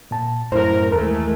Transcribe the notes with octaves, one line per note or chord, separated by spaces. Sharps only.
A#2 A5
F#2 A2 E4 A#4 C5
D#2 E3 G#3 A3 A#4